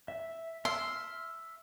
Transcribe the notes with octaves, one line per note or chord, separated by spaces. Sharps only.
E5
E5 C6 E6 F6